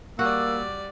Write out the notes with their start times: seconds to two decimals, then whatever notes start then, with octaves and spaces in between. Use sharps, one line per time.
0.19 G3 A#3 F#4 D5 F#5 E6